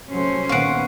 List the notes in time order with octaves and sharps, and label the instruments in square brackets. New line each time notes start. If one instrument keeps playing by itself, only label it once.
[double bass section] C2 F#3 A3 [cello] C#4 C5
[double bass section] A#2 D#3 B3 [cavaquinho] F5 F#5 [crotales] C#6 C7 D7